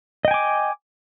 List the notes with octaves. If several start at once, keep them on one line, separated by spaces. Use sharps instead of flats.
D#5 G5 G#5 D6